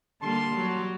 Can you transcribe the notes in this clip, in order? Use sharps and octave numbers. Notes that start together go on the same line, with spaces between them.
D3 G3 A#3 A5 C6
F#3 G3